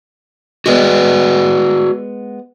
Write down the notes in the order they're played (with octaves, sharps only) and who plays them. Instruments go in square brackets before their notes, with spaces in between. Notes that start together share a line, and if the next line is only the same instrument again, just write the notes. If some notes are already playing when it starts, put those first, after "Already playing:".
[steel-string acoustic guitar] G#3 B3 [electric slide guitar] F#4 G#4 D5